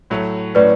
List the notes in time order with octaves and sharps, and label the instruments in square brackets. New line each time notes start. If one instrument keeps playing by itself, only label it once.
[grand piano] A2 F#3 A3
[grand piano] A2 F#3 C#4 [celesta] B4 D5